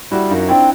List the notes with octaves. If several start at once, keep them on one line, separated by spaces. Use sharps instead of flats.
G3 E4 F#4
F#2 D#4 F4
C4 D4 E4